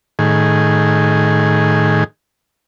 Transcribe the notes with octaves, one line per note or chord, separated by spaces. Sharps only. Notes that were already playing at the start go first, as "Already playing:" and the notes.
A2 D#3 G#4